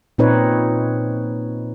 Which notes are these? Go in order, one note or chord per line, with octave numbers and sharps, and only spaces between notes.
A#2 C4 D#4 B4 C#5